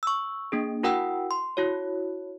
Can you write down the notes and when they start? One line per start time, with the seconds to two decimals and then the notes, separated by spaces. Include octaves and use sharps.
0.03 C#6 E6
0.52 A#3 D4 G#4
0.83 E4 F#4 A#4 F#5 G5 E6
1.31 C6
1.57 E4 F#4 C#5